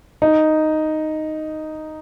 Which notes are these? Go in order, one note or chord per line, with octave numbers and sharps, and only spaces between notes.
D#4